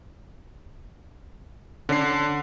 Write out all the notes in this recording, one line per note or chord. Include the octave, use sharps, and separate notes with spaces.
D3 C#4 C7